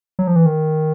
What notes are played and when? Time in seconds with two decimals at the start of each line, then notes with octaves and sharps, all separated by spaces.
0.19 F#3
0.27 F3
0.36 E3
0.46 D#3